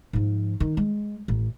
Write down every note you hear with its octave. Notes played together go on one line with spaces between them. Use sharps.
G#2 F3
D#3
G#3
A1